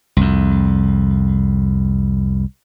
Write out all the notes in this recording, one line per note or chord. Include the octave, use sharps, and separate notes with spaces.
C2 F2